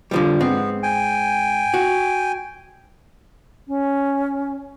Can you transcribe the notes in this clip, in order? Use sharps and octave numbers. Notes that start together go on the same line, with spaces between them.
D3 F3 G3
G#2 B3 C4
G5 G#5
F#4
C#4